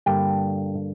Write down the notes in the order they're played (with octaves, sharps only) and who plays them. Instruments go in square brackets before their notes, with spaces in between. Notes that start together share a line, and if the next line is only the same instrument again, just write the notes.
[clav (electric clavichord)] G2 D3 G3 A#3 G5